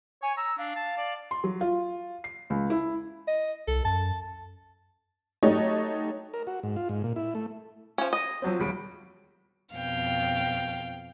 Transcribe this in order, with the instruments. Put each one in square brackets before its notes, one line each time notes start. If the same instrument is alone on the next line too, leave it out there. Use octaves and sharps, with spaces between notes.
[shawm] C#5 [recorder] G#5
[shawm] A#5 [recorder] E6
[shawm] D4 [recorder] F5
[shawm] A5
D5
[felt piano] C6
F#3
F4
C7
C#2
E4
[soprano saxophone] D#5
[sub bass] C2 [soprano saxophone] A4
[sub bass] F#2 [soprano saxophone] A5
[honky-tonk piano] F#3 A3 D#4 G4 C#5 D#5
[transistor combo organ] A#4
F#4
G#2
F4
G#2
A#2
E4
A3
[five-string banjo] F3 C#4
D#5
[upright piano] F3 F#3 C4
D#1 G3 D7
[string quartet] F2 B2 F5 G5